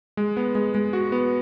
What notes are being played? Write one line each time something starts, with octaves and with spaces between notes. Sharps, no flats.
G#3
B3
G#3
G#3
F#4
B3